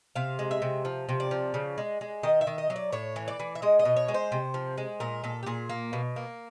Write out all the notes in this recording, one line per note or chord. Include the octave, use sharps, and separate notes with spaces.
C3 F5
G#3
E5
C3
F3
C3
D5
F3
C#3
G#3
G#3
D#3 D#5
E5
D#3
D#5
F#3
D5
A2 C#5
E3
D5
E3
E5
G#3 D#5
D#5
B2
C#5
G#3
C5
C3
F3
G#3
A#2 A#4
A#2 A4
G4
A#2 G#4
A#3
B2
A#3